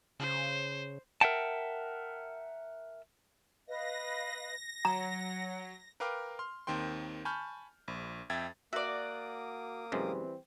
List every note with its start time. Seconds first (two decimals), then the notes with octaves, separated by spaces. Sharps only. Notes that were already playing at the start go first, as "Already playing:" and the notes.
0.20 C#3 C5
1.21 A#4 E5 F#5 G5 A5
3.68 B4 D#5 F5 A#6
4.85 F#3 F#5 A#5
6.00 A#4 B4 F5 G5 D6 F6
6.39 C6 F6
6.67 D#2 D#3 C4 G5 C6
7.25 G#5 A5 B5 C#6 F6 G6
7.88 A#1
8.30 F2 E5 G5 G#6 A6
8.73 A#3 F#4 D5 E5 D6 D#6
9.92 F#2 C3 E3 G3 G#3 C4